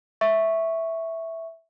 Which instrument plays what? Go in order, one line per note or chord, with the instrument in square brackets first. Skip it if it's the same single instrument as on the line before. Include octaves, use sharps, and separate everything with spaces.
[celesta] E5 C#6